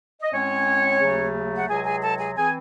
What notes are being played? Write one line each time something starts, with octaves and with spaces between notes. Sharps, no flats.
D#5
A2 G#3 C4 C#4 C#5
D#2 C#3 F#3 A3
F#5
C#2 C3 F#3 G#4 G#5
G#4 G#5
A4 A5
G#4 G#5
E3 C4 G#4 G#5